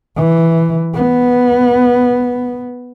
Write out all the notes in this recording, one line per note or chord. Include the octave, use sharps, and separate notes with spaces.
E3
B3